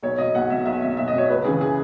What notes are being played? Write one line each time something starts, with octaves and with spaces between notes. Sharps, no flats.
B1 C#5
B2 D#5
B1 F#5
B2 E5
B1 E5
B2 E5
B1 E5
D#5
B2 C#5
C#2 B4
C#3 E3 G#4
G#4